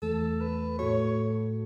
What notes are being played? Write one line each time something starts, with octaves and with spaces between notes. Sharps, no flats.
E2 E3 A3 A4
B4
A2 A3 F#4 A4 C#5